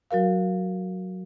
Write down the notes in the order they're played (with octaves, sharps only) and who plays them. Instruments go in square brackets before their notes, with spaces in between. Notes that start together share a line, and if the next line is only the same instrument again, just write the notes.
[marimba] F#3 F#4 A#4 F5